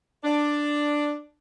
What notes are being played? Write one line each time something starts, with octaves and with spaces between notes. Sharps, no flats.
D4